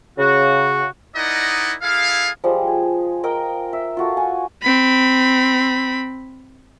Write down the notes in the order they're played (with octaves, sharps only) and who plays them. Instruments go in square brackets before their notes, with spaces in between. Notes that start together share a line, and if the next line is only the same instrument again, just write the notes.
[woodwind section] C#3 F#4
[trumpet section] D#4 E4 A#4 D5 D#5 F#5
E4 G#4 A4 F5
[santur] F3 G3 G#3 C5
G#4
A#4 D#5 G5
E5
F4 F#4 A4
F#5 G#5
[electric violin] C4 B5